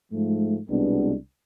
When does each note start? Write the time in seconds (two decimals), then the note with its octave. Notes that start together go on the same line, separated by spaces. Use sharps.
0.11 G#2 F3 A3
0.68 C2 B2 G#3 B3 D4